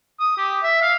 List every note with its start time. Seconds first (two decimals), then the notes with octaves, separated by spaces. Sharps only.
0.20 D#6
0.37 G4
0.63 E5
0.81 F5